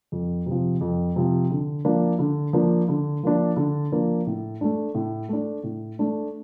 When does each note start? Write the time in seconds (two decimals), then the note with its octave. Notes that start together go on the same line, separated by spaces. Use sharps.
0.12 F2
0.46 C3
0.51 F3
0.81 F2
1.16 C3 F3
1.51 D3
1.85 F3 A#3 D4
2.19 D3
2.53 F3 A#3 D4
2.88 D3
3.23 F3 A#3 D4
3.56 D3
3.92 F3 A#3 D4
4.26 A2
4.61 A3 D4
4.95 A2
5.29 A3 D4
5.63 A2
5.99 A3 D4